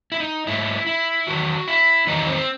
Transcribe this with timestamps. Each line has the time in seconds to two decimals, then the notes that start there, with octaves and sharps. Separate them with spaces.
0.12 E4
0.20 D#4
0.47 G#2 F#3 E4
0.87 E4
1.27 E2 D#3 F#3 F#4
1.68 E4
2.07 E2 D#3 F#3 D#4
2.27 C4